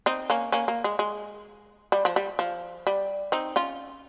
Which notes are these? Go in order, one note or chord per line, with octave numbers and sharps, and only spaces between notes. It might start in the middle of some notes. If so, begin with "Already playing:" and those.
C4 D#4
A#3 C#4
A#3 C#4
A#3
G#3
G#3
G3
F3
G3
F3
G3
C4 D#4
C#4 F4